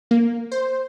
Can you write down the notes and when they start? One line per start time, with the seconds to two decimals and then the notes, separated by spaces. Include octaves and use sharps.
0.11 A#3
0.52 C5